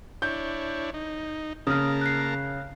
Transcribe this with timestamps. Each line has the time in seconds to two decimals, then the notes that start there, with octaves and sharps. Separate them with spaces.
0.22 D4 E4 C#5 G6
0.94 D#4
1.67 C#3 A#3 A5 A#5 D#6 F6
2.01 F#6 C7